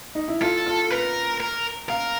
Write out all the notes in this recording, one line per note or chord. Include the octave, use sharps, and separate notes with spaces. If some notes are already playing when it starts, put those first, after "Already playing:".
D#4
E4
F4 A4
F4
A#4 B4
A#4
A#4 F5